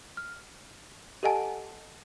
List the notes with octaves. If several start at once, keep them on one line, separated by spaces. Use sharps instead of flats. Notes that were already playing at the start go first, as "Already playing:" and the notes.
F6
G4 A4 D#5 F#5 G#5 A5